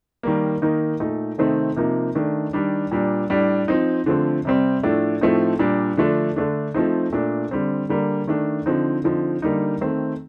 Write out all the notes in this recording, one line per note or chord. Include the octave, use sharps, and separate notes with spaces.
D#3 G3 A#3
D#3 A#3 D#4
A#2 A3 D#4
C3 D#3 A3 C4 D#4
C3 F3 A#3 D#4
D#3 A3 D4
D#3 G3 D4
A#2 G3 D4
A2 G3 D4
F3 C4 D#4
D3 F3 A3 C4
C3 G3 C4
A2 F3 A3 D4
A2 F3 A3 C4 D#4
A#2 G3 D4
D3 F3 A3 D4
D3 A3 D4
F3 A3 C4 D#4
A#2 A3 D4
D3 G3 C4
D3 G3 A#3
D#3 A3 D4
D3 F3 C4 D#4
D3 F3 C4 D#4
D3 G3 A#3 D#4
D#3 A3 C4